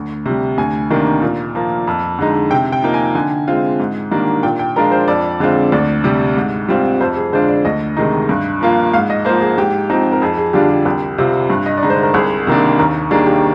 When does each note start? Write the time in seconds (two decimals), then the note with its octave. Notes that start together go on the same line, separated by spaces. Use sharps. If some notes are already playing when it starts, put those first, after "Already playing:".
Already playing: D2
0.26 C3 G3
0.58 D2 G#5
0.90 C3 D#3 A#3 D4
1.22 A#2
1.55 F3 A#3
1.87 F2
2.19 D3 G#3 D#4
2.51 C3 G5
2.72 G5
2.83 F3 A#3 D#4
2.94 G#5
3.15 D3 G#5
3.48 G#3 C4 F4
3.80 G#2
4.11 D#3 G3 A#3 D4
4.43 A#2 G5
4.59 G5
4.76 F3 G#3 D4 F4 A#4
4.92 C5
5.08 F2 D5
5.40 D3 G#3 C4 F4
5.72 D2 D5
6.04 C3 G3
6.37 G#2
6.68 G3 C4 F4
7.01 F2 C5
7.16 G#4
7.33 D3 G#3 D4 F4 C5
7.48 D5
7.65 D2 D#5
7.97 C3 D#3 G#3 D#4
8.29 G2
8.61 F3 A#3 F4
8.93 G#2 F5
9.10 D#5
9.25 A#3 C5
9.29 F3
9.41 G#4
9.58 G#2 G4
9.90 F3 C4 D#4
10.12 A#4
10.22 F2 G#4
10.37 G#4
10.53 D3 G3 D4 F4 G4
10.70 G4
10.85 C2 G4
11.18 C3 G3 C4 F4
11.50 G2
11.66 D#5
11.78 D5
11.83 D3 G#3 D#4
11.90 C5
12.03 A#4
12.14 C2 G#4
12.47 C3 D#3 A#3 D4
12.79 D#2 A#4
13.11 D#3 G3 A#3 D4 G#4
13.26 G4